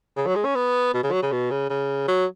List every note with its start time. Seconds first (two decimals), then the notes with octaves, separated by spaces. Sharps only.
0.17 C#3
0.26 F#3
0.36 G#3
0.45 C#4
0.55 B3
0.94 B2
1.03 C#3
1.12 F#3
1.22 C#3
1.32 B2
1.51 C#3
1.70 C#3
2.08 F#3